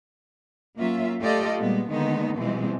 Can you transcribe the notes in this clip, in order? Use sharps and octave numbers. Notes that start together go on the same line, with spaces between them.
F#3 A#3 C#4 F4 E5
A3 F4 G4 A4 D5 D#5
A#2 G3 G#3 A#3 B3
D3 D#3 G#3 A#3 B3 D#4
B2 E3 F3 G3 G#3 C4